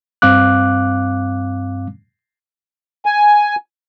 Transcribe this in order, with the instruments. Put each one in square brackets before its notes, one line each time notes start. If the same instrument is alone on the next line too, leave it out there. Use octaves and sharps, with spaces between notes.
[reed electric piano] G2 C4 F5 D6 F#6
[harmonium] G#5